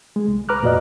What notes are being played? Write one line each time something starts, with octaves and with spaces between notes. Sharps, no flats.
G#3
C2
B4 A#5 D6 F6 F#6
F2 A#2 F#4 D5 D#5